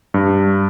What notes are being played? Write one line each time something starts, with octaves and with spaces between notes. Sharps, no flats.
G2